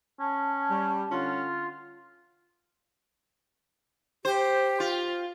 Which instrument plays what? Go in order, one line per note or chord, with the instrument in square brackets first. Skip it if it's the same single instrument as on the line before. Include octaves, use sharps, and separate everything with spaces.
[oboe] C#4 [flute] A5
[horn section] G3
[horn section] D3 C#4 F#5 [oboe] F4
[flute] G4 [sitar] C5
[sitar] F4